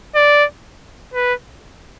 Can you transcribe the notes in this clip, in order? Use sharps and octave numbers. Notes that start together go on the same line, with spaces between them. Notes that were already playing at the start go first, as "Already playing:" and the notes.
D5
B4